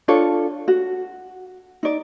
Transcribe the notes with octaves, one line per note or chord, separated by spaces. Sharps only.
D4 F4 A4 C#5
F#4
D#4 D5